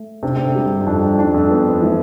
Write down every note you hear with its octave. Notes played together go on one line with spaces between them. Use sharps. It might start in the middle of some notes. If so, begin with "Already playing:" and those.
Already playing: A3
C3 D4
C3
D3
G3
G2
G2
F2 D4
G2
G2 D4
F2
B3
E3